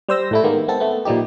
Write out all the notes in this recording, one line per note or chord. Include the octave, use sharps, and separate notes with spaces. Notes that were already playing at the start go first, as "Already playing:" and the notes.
G3 C5 E6 A#6
A2 A3 E4
D#3 G#3 A#3 B3
G#3 B3 C4 A4
A3 B3
A#2 F3 G3 D#4 G4